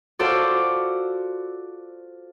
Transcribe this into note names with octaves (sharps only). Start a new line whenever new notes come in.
F4 F#4 A4 C5 D5